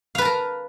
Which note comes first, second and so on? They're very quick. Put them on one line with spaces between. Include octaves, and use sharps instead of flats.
F5 B4 A5 A#4